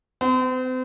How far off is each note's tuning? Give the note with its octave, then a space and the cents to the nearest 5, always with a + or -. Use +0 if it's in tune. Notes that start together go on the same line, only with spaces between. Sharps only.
C4 -40